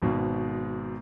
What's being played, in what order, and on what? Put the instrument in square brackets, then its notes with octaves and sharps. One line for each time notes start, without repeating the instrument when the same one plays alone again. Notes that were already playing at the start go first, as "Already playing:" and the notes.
[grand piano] G#1 G#2 B2